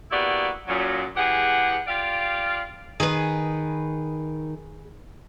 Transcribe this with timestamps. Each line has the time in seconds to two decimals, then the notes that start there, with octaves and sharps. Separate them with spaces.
0.11 A#3 B3 E4 F#4 G4 D5
0.67 F#2 A#2 F#3
1.16 E3 G#3 G4 G#4 F#5
1.87 F4 G4 D5 F5
3.00 D#3 G#4 B4